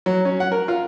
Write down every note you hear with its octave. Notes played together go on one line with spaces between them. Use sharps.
F#3
C#4
F#5
A#4
F4